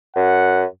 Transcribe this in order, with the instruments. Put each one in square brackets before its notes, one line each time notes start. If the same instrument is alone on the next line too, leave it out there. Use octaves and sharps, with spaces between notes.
[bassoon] F#2 [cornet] F#5